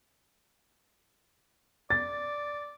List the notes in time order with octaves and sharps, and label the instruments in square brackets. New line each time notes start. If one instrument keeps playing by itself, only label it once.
[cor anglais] D5 [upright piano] A6